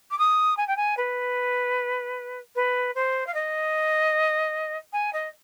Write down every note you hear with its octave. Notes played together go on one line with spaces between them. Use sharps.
D6
D#6
G#5
G5
G#5
B4
B4
C5
F5
D#5
G#5
D#5